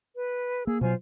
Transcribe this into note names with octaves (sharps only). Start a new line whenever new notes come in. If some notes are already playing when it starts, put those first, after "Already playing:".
B4
A#3 G#4 E6
B2 F#3 F4 C5 G#5